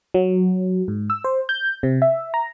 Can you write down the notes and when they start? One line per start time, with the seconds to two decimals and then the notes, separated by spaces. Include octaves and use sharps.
0.14 F#3
0.88 G#2
1.10 E6
1.24 C5
1.49 G6
1.83 C3
2.02 E5
2.34 A#5